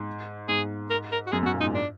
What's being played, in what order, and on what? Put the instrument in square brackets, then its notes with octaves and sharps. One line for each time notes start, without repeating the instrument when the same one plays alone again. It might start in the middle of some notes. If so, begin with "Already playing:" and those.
Already playing: [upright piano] G#2
[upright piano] G#2 [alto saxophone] G#4
[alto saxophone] A#4
A#4
F#4
[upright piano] F#2 [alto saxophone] G#4
[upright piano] F#2
[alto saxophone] F#4
[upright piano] A#2
[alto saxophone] D#4
[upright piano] G#2
[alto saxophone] D4